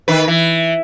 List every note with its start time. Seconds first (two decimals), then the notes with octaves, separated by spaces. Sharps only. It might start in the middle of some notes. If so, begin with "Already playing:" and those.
0.08 D#3 B4
0.28 E3